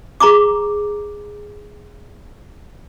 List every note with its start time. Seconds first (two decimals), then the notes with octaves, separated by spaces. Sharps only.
0.20 G#4 A#5 C#6 D6